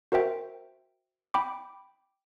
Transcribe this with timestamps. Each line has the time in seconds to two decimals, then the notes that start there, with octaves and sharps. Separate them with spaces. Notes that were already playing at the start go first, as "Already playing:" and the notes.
0.12 F#4 A#4 C5 E5 G5
1.34 G5 B5 D6